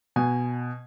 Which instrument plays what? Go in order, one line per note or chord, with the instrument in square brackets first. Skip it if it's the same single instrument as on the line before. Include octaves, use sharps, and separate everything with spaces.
[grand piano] B2 G#5